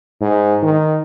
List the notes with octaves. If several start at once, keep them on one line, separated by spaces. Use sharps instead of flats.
G#2
D#3